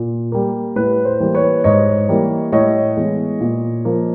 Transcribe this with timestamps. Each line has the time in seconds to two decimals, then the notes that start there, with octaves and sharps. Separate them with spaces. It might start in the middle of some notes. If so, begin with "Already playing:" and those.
Already playing: A#2
0.32 G3 A#3
0.76 A2 B4
1.05 C5
1.20 E3 G3 A#3
1.34 B4 C#5
1.64 G#2 C#5 D#5
2.09 E3 G3 A#3
2.52 A2 C#5 D#5
2.97 E3 G#3 B3
3.41 A#2
3.85 F3 A#3